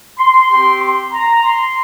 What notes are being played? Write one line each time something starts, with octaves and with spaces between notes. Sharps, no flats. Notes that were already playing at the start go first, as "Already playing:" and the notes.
C6
C4 G4 C6
C6
A#5
C6